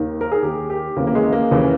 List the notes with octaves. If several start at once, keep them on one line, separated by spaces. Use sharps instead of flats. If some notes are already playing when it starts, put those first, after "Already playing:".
Already playing: D#2 D#3
A#4
G#4
D#2 D#3 G4
G4
D#2 C#3 E3 A#3
A#3
G#3
A#3
D#2 C#3 E3